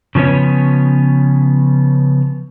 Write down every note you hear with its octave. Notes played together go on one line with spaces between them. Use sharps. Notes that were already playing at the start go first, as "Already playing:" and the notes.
C#3 F3 B3 C#4 C#5